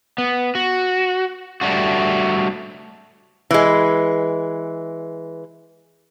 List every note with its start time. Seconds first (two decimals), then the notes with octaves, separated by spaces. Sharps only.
0.18 B3
0.55 F#4
1.61 G3 A3 D4 F#4
3.51 E3 G#3